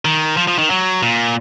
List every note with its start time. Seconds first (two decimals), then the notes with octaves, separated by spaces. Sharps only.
0.05 D#3
0.37 F3
0.47 F3
0.58 D#3
0.70 F#3
1.03 A#2